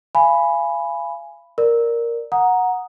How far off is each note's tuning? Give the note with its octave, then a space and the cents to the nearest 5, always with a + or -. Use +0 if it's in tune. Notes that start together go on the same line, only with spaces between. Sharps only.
F5 -35 G#5 +0 B5 +0
A#4 +0 D5 +0
F#5 -10 A#5 +0 D#6 +0